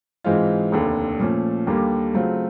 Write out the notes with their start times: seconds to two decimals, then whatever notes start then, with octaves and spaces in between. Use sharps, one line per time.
0.24 G#2 E3 G#3 C4 F4
0.72 F1 D#2 D3
1.19 A#2 F3 A3 C#4
1.67 D#2 D3 G3 A#3
2.13 C#3 F#3 A3 C4 F4